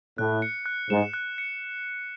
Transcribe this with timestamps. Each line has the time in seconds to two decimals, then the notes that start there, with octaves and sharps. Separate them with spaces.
0.18 A2 F#6
0.42 C#7
0.66 F#6
0.90 G#2 E7
1.13 F#6
1.38 C#7